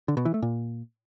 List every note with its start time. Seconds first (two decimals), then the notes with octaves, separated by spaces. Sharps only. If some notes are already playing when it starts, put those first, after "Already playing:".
0.08 D3
0.17 B2
0.25 E3
0.34 A3
0.42 A#2